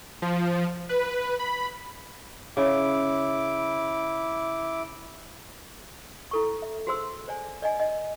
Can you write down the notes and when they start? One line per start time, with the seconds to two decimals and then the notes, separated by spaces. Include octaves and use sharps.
0.22 F3
0.89 B4
1.39 B5
2.57 C#3 E4 D6
6.31 E4 A4 C#6
6.62 E5
6.87 F#4 G#4 C5 C6 E6
7.28 C5 D5 G#5
7.62 D5 D#5 G#5
7.80 D#5